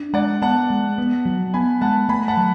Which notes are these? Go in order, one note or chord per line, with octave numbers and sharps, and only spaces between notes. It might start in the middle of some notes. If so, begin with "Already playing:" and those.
Already playing: D4
G#3 D5 F#5
B3 F#5 A5
G#3
B3
F#3
B3 G#5 B5
G#3 F#5 A5
A3 G#5 B5
F#5 A5
F#3